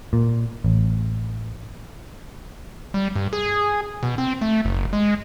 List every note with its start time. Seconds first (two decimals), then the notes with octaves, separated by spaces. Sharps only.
0.13 A#2
0.64 A1
2.94 G3
3.16 G2
3.33 G#4
4.03 B2
4.18 C4
4.41 A3
4.65 F#1
4.93 G#3